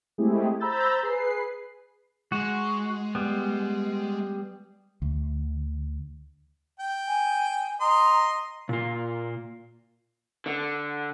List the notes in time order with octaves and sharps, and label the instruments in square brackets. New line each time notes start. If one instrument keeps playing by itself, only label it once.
[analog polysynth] G#3 A3 C4 E4 G4 G#4
C5 A#5 B5 E6 G6 A6
G#4 B4 C7
[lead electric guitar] G#3 [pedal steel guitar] F#4
[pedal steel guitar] G3 B3
[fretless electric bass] D2
[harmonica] G5
[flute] G#5
[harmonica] D#5 C6 [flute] A#5
[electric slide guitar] A#2 F4
[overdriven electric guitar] D3